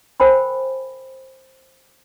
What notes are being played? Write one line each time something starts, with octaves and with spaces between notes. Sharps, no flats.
A#4 C5 G5 G#5 B5